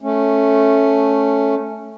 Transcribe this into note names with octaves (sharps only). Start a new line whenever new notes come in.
A3 C#4